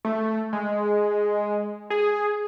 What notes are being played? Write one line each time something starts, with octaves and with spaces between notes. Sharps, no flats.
A3
G#3
G#4